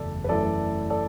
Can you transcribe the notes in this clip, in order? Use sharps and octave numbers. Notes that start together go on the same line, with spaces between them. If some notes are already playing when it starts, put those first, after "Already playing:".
Already playing: F#1 E2 A3 A4 D5
B4
F#2 E3 A3 E4 A4 D5
A4 D5